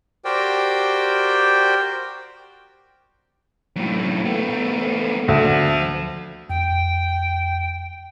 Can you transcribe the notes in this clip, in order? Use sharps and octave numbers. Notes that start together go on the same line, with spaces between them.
F#4 G4 A#4 C5 D5 G5
F#2 A2
A3 B3
D2 F3 A5
F2 G5